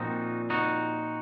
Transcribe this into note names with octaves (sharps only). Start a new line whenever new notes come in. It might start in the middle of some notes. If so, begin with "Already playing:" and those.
Already playing: A#2 F3 C4 D#4 F#4
D#4 F#4